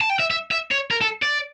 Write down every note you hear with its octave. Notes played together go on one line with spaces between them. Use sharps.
A5
G5
E5
E5
E5
C#5
A#4
A4
D5